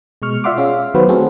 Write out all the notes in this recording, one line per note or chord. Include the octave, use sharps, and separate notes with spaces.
B2 G#3 C#6 F6
F4 D5 E5 F#5 C6 D6
C#4 G#4 F5
D#3 F#3 B3 F#4 B4 C5
A3 C4 C#4 F#4 G#4 A4